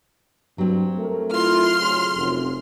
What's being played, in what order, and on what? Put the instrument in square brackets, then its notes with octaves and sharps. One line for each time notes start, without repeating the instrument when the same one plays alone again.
[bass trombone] G2 [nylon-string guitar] F#3 C4
[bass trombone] A3 [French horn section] A#4
[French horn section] E4 F4 [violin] C6 F6
[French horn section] D2 C#3
[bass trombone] F1 [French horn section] F#2 F3